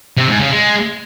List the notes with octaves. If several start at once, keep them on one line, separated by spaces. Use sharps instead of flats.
C3
G#2
C#3
G#3